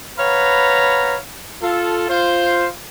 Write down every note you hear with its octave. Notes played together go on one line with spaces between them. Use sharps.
B4 C#5 F5 F#5 A#5 B5
F4 A4
F4 C5